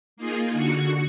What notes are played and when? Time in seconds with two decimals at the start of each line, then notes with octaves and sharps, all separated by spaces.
0.17 A#3 D#4 F4 G#4
0.52 D3 F#4 C#6 C#7